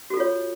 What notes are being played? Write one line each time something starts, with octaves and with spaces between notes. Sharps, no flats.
F4 F#4 A4 C#5